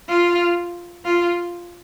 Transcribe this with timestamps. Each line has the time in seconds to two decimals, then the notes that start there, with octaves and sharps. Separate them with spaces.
0.09 F4
1.05 F4